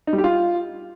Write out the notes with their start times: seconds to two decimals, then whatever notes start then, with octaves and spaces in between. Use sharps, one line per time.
0.07 D#4
0.13 G3
0.18 G4
0.24 F4